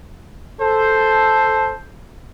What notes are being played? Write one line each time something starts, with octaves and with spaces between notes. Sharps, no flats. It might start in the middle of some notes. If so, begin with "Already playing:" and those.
A4 C5